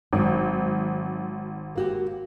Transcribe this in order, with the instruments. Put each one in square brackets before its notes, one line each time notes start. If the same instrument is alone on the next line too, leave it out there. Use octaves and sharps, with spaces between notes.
[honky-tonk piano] G#1 [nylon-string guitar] F#3 C4
[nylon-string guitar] A#3 F#4 G4